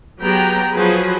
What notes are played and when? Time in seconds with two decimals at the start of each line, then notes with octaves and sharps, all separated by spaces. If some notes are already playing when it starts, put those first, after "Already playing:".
0.21 F#3 B3 G4 G#4 G5 A#5
0.72 F3 F#3 F#4 G#4 B4